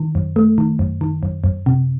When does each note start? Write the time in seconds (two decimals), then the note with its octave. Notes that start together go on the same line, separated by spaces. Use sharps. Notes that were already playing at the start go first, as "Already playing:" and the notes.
Already playing: D#3
0.15 F#2
0.36 A3
0.58 D#3
0.79 F#2
1.01 D#3
1.23 F#2
1.44 F#2
1.66 C3